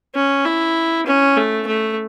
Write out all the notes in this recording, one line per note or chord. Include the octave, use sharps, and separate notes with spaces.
C#4
E4
C#4
A3
A3